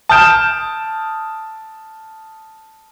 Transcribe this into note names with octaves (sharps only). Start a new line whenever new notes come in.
A5 D#6 F6 G6 D7 E7